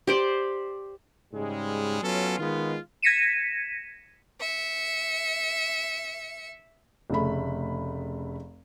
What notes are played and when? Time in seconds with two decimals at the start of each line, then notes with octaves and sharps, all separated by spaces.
0.07 G4 C5 D5
1.33 G#2 C#3 G3 G#3
2.03 F#3 B3 C#4 F4 A4
2.39 D#3 G#3 B3 F4
3.02 G#6 A#6 B6 C#7 D#7 E7
4.40 E5 C#7
7.10 F1 C#3 A3 B5